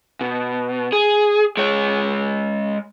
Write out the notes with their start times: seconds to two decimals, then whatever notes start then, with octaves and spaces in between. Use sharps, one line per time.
0.21 B2
0.93 G#4
1.57 G#3 C#5